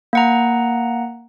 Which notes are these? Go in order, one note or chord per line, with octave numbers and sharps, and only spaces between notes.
A#3 F#5 A#5